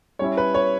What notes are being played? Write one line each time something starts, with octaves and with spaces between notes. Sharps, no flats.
G3 C#4 E4 C#5
B4
C#5